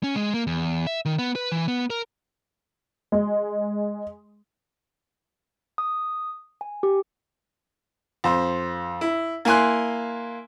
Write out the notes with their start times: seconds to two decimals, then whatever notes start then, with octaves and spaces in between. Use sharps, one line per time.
0.03 C#4
0.16 G#3
0.34 A#3
0.47 E2
0.87 E5
1.05 D#3
1.19 B3
1.35 B4
1.52 E3
1.68 B3
1.90 A#4
3.12 G#3
5.78 D#6
6.61 G#5
6.83 G4
8.24 F2 C5
9.01 E4
9.45 A#3 E4 G#5 C6 F#6